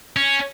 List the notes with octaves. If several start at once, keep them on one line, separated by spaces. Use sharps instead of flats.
C#4